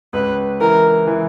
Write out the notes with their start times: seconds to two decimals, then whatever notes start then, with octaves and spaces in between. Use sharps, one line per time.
0.13 C#2 B4
0.61 E3 A#4
1.07 E3